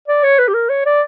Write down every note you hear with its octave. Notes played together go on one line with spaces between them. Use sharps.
D5
C#5
B4
G4
A#4
C#5
D5